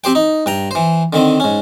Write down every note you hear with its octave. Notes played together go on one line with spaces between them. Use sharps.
C4 G4 C5 G5
D#4
G2 G5 A#5
E3 C5
D3 D#3 C4
G#2 C#4